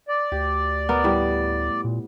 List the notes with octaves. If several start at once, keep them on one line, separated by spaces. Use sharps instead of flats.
D5
D2 G4
B3 A#4
A2 G3
A#2